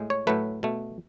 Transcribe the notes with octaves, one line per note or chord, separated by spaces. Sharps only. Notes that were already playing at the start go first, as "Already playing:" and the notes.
Already playing: A2 G#3
C#5
A2 F#3 A3 B4
B2 A3